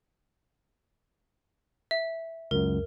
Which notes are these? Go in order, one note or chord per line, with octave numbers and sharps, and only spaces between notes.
E5
C#2 F#2 A#4